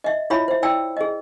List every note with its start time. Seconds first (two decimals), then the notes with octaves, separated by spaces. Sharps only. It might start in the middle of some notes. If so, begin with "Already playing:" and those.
0.04 D#5 E5
0.30 E4 F4 C#5 E5 B5
0.48 C5 E5
0.63 E4 D5 G5 E6
0.97 G#4 D#5